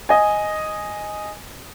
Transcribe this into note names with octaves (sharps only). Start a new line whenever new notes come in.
D#5 G#5